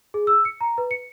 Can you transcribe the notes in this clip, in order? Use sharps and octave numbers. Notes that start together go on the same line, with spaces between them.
G#4
E6
C#7
A#5
B4
C#7